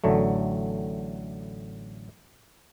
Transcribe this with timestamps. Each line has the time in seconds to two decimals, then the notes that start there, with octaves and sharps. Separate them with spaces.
0.04 A1 D3 F#3 A3